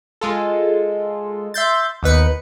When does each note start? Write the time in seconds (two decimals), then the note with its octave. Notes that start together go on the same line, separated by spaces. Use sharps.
0.21 G#3 F4 A4
1.54 E5 C6 G6 A6
2.03 D#2 B3 D#4 B4 C#7